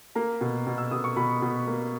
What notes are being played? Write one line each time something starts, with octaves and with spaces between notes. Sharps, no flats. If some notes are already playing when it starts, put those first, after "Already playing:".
A#3 A#5
B2
B2
E6
B2 D#6
C#6
B2 B5
B2
A#3